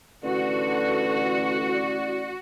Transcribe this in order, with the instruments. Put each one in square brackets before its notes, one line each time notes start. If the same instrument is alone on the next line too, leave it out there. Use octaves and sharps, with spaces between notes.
[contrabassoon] A1 [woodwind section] D3 [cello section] F#4 [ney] B4
[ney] D5